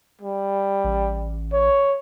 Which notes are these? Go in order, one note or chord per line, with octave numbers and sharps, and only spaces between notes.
G3
A1
C#5